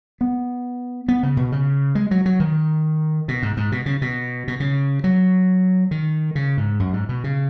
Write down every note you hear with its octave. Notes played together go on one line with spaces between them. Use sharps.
B3
B3
C#3
B2
C#3
G#3
F#3
F#3
D#3
B2
G#2
G#2
B2
C#3
B2
B2
C#3
F#3
D#3
C#3
G#2
F#2
G#2
B2
C#3